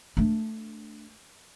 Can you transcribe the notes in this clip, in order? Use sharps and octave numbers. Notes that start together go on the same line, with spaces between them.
A3 D4